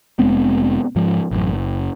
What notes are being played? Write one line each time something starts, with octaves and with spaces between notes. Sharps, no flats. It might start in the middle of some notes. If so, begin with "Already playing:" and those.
F1 G#3 B3 C4
G#2 F3
A1 F#2
F#1